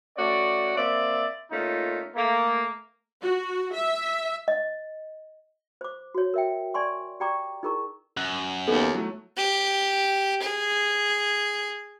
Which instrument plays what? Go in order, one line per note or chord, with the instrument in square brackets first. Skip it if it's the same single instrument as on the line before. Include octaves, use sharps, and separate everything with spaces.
[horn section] A3 C#4 F#4 D5
A#3 C4 D5 E5
A#2 A3 C#4 D#4 F4
A3 A#3
[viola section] F#4
E5
[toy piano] D#5
C5 D6
F#4 C#5
A#4 E5 G5
D5 G#5 C6 C#6
G4 D5 G5 A#5 C#6 D6
D#4 E4 G#4 A#4 A#5 C#6
[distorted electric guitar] F#2 [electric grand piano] F#6
[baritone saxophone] D#2 [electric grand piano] B3 [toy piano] A4
[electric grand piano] F#3 A3 [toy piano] E4
[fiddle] G4
G#4